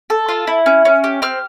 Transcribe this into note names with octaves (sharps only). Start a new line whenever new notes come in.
A4
F4
E4
C#4
C#4
G4
C4 F6